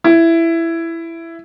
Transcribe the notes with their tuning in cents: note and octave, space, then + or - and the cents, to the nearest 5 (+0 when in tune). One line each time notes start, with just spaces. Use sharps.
E4 +10